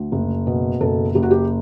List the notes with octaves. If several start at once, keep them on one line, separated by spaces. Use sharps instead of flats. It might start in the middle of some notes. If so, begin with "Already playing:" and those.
Already playing: D2
F#1
B2
F#1 A4
F#1 G4
F#4
G4